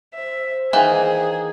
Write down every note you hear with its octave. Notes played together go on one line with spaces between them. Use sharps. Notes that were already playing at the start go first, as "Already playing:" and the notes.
C5 E5
D#3 E3 A#3 G#4